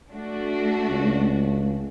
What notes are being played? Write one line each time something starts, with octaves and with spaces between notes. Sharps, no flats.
A3 D4 F#4
C#2